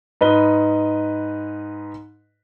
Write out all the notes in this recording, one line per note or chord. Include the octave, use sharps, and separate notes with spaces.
G#2 B4 D#5 B5 G7